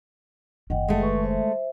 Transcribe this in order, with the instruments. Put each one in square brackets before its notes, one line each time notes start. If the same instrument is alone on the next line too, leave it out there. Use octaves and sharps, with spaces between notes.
[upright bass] F#1 D#3 [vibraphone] D#5 F#5 G5
[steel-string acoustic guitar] G#3 A3
[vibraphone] B4 C#6
C5 E5